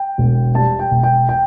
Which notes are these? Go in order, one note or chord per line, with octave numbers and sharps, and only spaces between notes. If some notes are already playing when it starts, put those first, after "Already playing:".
Already playing: G5
E1
G3 A5
G5
E1
G5
G5